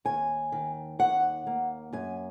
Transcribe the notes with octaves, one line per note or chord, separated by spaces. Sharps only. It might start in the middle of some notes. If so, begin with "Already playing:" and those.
D#2 G#5
D#3
D#2 F#5
A#3
F#2 G#5